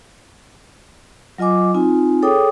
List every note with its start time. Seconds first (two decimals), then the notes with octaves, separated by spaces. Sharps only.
1.38 F#3 F4 D#5 G#5 D6
1.74 C4 D#4 F4 G#5
2.22 G#4 A4 C#5 G5 D6 D#6